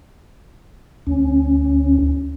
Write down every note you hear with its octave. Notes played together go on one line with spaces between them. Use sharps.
D2 C#4